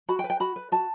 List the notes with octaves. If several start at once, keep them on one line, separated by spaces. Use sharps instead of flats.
F#4 B5
G5
B4
G5
F#4 B5
B4
F#4 A5